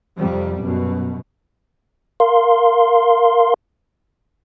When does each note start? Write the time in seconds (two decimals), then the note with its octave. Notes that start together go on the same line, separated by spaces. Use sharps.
0.17 F2 C3 G3
0.61 F#2 B2
2.20 A#4 F5 C6